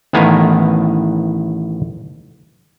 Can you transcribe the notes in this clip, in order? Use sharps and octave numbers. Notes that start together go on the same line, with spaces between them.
A1 A2 D#3 B3 F5 G#5